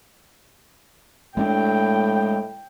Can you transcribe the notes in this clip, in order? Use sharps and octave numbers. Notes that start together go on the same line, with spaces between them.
A2 G#3 C#4 D4 G5